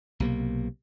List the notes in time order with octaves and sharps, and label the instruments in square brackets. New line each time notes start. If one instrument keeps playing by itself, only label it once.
[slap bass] B1 C3 A#3